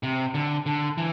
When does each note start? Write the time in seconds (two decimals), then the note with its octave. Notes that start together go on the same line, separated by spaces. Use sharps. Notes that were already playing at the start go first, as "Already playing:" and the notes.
0.03 C3
0.34 D3
0.66 D3
0.98 E3